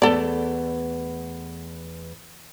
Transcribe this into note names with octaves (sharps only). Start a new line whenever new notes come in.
E2 A3 B3 A4 D5